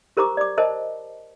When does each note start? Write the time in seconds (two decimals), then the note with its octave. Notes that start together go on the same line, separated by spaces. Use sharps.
0.17 G4 A#4 C5 A#5 C#6 D6
0.37 D5 D6
0.58 A#4 C5 D#5 A5